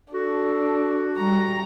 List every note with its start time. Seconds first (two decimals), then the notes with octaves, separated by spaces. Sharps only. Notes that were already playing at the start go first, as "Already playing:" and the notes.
0.14 D4 F#4 A4
1.17 G3 A#5